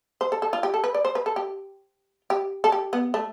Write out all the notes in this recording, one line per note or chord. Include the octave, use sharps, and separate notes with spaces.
C5
A4
A4
F4
G4
A4
B4
D5
C5
B4
A4
G4
G4
A4
G4
B3
A3